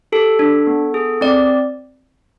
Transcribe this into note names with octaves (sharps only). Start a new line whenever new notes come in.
G4 A4
D4
B3
G#4
C4 D5